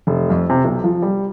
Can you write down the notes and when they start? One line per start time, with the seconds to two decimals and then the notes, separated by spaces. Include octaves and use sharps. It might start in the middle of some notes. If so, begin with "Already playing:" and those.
0.07 F1
0.30 F2
0.50 C3
0.65 B1
0.84 F3
1.02 G3